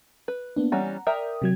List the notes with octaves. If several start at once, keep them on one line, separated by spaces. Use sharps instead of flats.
B4
A#3 B3 D4
E3 G3 C#4 F#5 A#5
A#4 D5 E5 G5 A#5 D#6
C3 F#3 G#6